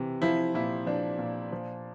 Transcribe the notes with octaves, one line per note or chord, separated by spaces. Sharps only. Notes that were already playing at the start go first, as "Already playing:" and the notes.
Already playing: C3 E3
F3 E4
A#2 E4
F3 D4
A#2
F3